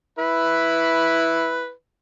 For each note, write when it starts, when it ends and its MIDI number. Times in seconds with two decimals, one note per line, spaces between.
0.19 1.71 64
0.19 1.71 71